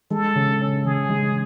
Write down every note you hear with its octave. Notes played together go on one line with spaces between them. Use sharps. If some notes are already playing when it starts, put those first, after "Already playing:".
G#3 A4
C#3
C#4
C#3 G#4
G#3